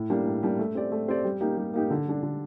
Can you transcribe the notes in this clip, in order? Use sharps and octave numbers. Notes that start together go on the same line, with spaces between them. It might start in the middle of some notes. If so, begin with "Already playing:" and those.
Already playing: A2
G3 A#3 D4
A2
G3 A#3 D4
A3
C4 G4 D5
A3
C4 G4 D5
G3
A#3 D#4 G4
G3
A#3 D#4 G4
D3
G3 D4
D3